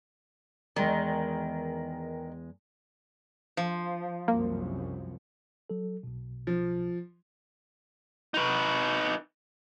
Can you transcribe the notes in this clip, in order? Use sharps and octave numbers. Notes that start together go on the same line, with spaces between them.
E2 D#3 G#3 D5
F3
C2 F#2 A#3
F#3 A4
B1 B2
F3
D#4 B4